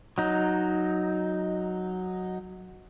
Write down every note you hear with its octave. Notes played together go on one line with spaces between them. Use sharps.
F#3 D#4